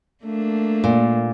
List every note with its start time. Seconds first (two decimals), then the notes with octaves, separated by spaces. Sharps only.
0.24 A3 A#3 D4
0.84 A#2